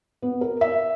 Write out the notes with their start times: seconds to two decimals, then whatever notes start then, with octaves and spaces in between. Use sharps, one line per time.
0.22 B3
0.41 A#4
0.61 E5